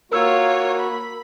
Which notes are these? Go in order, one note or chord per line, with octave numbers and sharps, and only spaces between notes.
A#3 F4 F#4 A#4 C#5 E6
B5